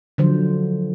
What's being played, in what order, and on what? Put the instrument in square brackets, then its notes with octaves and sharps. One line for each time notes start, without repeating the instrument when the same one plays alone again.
[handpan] D3 F3 F#3 C5